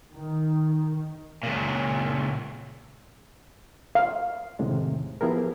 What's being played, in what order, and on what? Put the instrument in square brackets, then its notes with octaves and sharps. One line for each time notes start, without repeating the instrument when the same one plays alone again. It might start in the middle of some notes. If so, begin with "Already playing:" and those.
[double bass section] D#3
[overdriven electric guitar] C#2 A#2
[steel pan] F5
[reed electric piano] E2 A2 C3 D#3 G#3
F3 B3 E4 G4 G#4 A#4